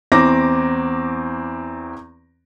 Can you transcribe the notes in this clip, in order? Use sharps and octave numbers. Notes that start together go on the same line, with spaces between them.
E2 C4 A#5 D6 A#6